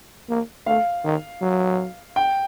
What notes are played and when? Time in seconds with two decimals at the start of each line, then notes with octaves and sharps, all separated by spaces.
0.29 A#3
0.66 A3 F5
1.04 D#3
1.42 F#3
2.16 G5